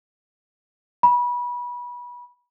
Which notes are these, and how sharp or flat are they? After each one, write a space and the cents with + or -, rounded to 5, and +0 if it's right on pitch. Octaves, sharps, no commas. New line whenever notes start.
B5 -25